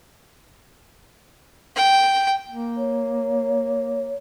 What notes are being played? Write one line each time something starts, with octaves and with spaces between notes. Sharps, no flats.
G5
A#3
C#5